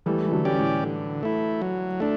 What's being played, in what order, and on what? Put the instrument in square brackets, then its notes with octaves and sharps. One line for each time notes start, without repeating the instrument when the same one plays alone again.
[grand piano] E3 G3 [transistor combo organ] A3
[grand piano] E3
D3 F#3
[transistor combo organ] C#4 G4 D5
[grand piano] A2
[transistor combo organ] D3
A3 E4
F#3
A3 D4